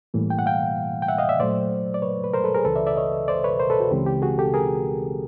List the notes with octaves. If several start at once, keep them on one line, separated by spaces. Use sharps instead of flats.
A2 E3 G3 A#3
G5
F#5
F5 G5
G5
E5 F#5
D#5 F5
D5 E5
A#2 F#3 A3 C5 D5
D5
B4 C#5
B4
A#4 C5
A4 B4
G#4 A#4
C#2 C#3 E3 A4 B4
D5 E5
D5 E5
C#5 D#5
C5 D5
B4 C#5
A#4 C5
A4 B4
F#4
C#2 C#3 E3 G#3 C4 G4
G4
F#4 G#4
G4 A4
G#4 A#4